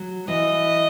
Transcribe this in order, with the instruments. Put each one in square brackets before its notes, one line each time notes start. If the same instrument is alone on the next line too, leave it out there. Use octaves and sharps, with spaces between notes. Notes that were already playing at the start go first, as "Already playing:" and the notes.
Already playing: [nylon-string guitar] F#3
[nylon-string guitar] E3 [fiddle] D#5